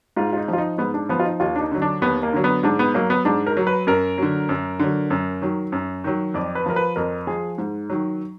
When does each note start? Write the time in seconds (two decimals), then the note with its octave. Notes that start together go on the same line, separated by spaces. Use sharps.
0.17 G#2 F4
0.33 F4
0.37 D#4
0.48 F3
0.53 F4
0.58 D#4
0.78 G#2 B3
0.94 D4
1.09 F3 B3
1.20 F4
1.25 D#4
1.40 D#2 F4
1.56 D4
1.61 D#4
1.71 D3 F#3
1.82 D4
2.02 D#2 B3
2.23 A#3
2.33 D3 F#3
2.44 B3
2.63 G#2 D4
2.79 B3
2.94 F#3 A#3
3.10 B3
3.25 G#2 D4
3.47 A#4
3.57 F#3
3.67 B4
3.87 F#2 A#4
4.18 D3 F#3
4.49 F#2
4.80 D3 F#3
5.10 F#2
5.41 D#3 F#3
5.72 F#2
6.04 D#3 F#3
6.34 F2 D5
6.55 B4
6.66 F3 A#4
6.76 B4
6.96 F2 A#4
7.27 F3 G#4
7.58 G#2
7.90 D#3 F#3